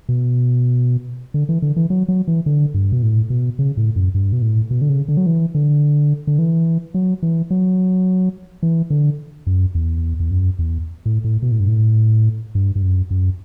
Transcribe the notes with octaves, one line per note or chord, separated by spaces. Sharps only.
B2
D3
E3
D3
E3
F#3
F#3
E3
D3
G2
B2
A2
B2
C#3
A2
F#2
G2
B2
A2
B2
D3
C#3
D3
F#3
E3
D3
D3
E3
F#3
E3
F#3
E3
D3
F#2
E2
E2
F#2
E2
A2
A2
B2
A2
G2
A2
G2
G2
F#2
F#2